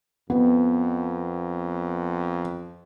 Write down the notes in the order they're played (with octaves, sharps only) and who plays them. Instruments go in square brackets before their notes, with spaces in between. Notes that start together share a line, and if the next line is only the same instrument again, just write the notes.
[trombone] F2 [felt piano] B3